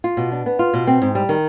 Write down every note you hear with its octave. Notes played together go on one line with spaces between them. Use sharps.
F4
B2
D4
B3
F4
B2
C4
G#2
G3
D#3